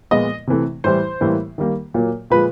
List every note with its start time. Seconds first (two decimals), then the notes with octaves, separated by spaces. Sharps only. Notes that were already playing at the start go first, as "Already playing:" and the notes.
0.11 A#2 F3 G#3 B3 D#5
0.47 C3 E3 A3
0.84 A2 E3 G3 C5
1.21 A2 E3 G3 A#3
1.58 D#3 G3 A#3
1.94 A#2 F#3 A#3
2.30 A#2 F3 G#3 B4